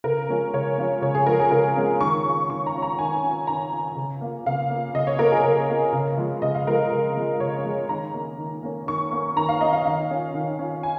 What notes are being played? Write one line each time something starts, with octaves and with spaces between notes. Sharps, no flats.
C#3 A#4
F3 G#3 C#4 F4
C#3 C#5
F3 G#3 C#4 F4
C#3 C#5
G#4
F3 G#3 C#4 F4 A#4
G#4
C#3 A#4
F3 G#3 C#4 F4
D#3 C#6
C#4 F4
D#3 C#6
A#5
C#4 F4
A#5
D#3 G#5
C#4 F4
D#3 A#5
C#4 F4
C#3
A#3 F4
C#3 F5
A#3 F4
C#3 D#5
C#5
A#3 F4 A#4
G#4
C#3 A#4
A#3 F4
C#3
F3 G#3 F4
C#3 D#5
F5
F3 G#3 F4 A#4
C#3
F3 G#3 F4
C#3 C#5
F3 G#3 F4
D#3 A#5
A#3 C#4
D#3
A#3 C#4
D#3 C#6
A#3 C#4
D#3 A#5
F5
A#3 C#4 D#5
F5
D#3 F5
C#4 F4
D#3
C#4 F4
G#5